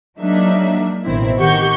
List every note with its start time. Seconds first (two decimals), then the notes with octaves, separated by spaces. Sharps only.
0.19 F#3 G#3 A#3 D4 D#4 E5
1.04 A1 B2 D#3 C4 E4
1.37 D#3 G4 F#5 C#6 G6 C#7